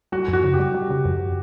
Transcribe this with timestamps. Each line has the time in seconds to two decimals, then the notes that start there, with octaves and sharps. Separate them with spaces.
0.12 G3 F#4
0.28 F#2
0.33 F#4
0.44 C#3
0.54 G4
0.59 G3
0.74 G3
0.90 C#3
1.05 F#2